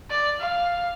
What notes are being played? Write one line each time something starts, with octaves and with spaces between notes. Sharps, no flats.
D5
F5